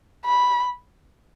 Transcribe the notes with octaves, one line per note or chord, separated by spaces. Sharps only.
B5